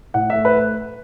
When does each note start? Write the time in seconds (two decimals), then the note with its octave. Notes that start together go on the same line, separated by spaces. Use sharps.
0.14 A2 F#5
0.30 E5
0.35 A3
0.45 B4
0.56 A3